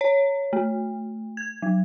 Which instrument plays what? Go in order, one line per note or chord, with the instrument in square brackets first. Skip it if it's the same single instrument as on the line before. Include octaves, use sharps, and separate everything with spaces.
[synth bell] C#5
A3
G#6
F#3